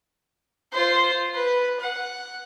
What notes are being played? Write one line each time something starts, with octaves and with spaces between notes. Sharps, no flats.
F4 C5
B4
F#5